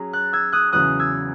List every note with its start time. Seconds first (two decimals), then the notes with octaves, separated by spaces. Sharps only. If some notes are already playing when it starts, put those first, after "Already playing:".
Already playing: F#3 C#4 G#4
0.13 F#6 A6
0.33 E6 G#6
0.52 D#6 F#6
0.72 E2 C#3 F#3 D#6 F#6
0.99 E6 G#6